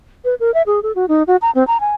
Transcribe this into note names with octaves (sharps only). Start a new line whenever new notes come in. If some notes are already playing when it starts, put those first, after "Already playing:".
B4
A#4
E5
G#4
A4
F#4
D#4
F#4
A#5
C4
A#5
G#5